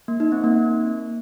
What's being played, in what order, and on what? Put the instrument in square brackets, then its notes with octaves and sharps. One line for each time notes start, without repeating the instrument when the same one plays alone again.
[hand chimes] A#3
D#4
C4
A#3